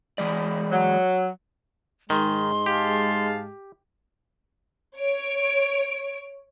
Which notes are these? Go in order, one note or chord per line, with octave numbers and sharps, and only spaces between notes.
E3 G#3 D5
F#3
G#2 D#3 G#3 C6
G4 F5 A5
C#5 D7